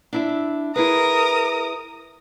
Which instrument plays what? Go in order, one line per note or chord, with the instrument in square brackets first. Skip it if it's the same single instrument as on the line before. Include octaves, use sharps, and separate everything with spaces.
[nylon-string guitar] D4 E4 E5
[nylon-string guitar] E4 G#4 B4 [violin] A#4 D#6